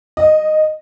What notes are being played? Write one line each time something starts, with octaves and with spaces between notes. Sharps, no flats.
D#5